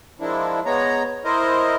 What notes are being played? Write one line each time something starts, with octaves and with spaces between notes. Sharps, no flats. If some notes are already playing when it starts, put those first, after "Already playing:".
F3 G#3 A#3 D4 E4
G#3 B3 C#5 A#5
E4 A#4 C5 D#5